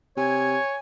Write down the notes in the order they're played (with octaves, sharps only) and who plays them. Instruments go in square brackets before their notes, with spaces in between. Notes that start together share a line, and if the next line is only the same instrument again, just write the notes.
[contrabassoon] C3 [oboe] C#5 [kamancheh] G#5